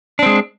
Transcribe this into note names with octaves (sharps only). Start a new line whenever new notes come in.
G#3 C4 D4